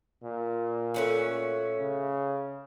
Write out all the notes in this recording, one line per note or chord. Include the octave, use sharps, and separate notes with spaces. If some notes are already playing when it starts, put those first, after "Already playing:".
A#2
A3 C#4 F#4
C#3